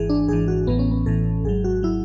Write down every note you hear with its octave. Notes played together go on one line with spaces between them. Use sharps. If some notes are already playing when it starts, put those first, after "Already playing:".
Already playing: G#1 G#2 E3 G#4
D4
G#1 G#2 E3 G#4
F#4
A1 A2 E3 B3
C#4
B3
A1 A2 E3 A4
G#1 G#2 F#3 G#4
F#4
F#3 E4